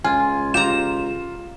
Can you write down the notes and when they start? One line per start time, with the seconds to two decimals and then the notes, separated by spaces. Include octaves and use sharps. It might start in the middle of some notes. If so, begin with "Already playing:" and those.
0.04 C#2 F4 G#5
0.54 F4 G4 A#5 E7